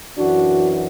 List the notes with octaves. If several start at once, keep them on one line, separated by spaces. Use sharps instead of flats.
F#2 E3 D4 F#4